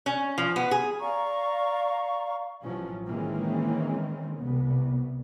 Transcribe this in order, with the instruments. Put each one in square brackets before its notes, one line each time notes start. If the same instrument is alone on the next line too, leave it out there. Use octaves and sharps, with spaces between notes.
[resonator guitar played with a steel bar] C#4
F3
B3
G#4
[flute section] D5 F5 A#5 C#6
[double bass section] A1 F3 F#3 C#4
D#3 E3 G#3 A#3 C4 C#4
C2 B3